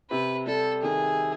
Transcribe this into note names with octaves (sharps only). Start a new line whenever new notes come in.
C3 B4
G3 A4
D#3 G#4